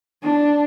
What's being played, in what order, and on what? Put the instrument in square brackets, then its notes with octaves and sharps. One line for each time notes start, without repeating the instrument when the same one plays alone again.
[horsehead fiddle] D4